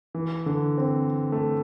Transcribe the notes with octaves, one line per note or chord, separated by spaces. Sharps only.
E3
D3
C4
A3